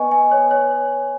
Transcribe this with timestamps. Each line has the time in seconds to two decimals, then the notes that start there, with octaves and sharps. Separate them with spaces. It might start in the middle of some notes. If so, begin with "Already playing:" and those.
Already playing: B3 D#5 G#5 C#6
0.12 G#5
0.31 C#5
0.51 C#5